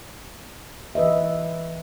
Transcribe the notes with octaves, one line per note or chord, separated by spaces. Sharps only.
E3 B4 D#5 E5